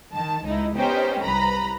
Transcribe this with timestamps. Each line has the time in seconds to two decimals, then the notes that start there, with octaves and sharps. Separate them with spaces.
0.12 D#3 A5
0.45 C#2 D#4 E4
0.76 B3 C#4 D#4 G4 C5 G5
1.22 C2 B4 A#5 B5